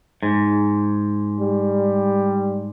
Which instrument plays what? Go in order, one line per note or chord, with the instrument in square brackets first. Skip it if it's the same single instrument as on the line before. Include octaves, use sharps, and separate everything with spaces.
[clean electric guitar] G#2
[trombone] G3